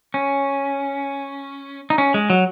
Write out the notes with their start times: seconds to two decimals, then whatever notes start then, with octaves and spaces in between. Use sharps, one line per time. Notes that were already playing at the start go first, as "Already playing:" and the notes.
0.14 C#4
1.90 D#4
1.98 C#4
2.14 G#3
2.30 F#3